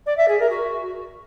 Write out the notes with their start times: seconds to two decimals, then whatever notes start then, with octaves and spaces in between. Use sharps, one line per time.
0.06 D5
0.17 E5
0.28 G#4
0.39 A#4
0.50 F#4